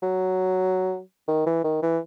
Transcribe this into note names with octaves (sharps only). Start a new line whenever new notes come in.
F#3
D#3
E3
D#3
E3